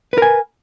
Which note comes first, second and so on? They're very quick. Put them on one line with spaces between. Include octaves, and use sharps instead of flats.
B4 A#4 G#5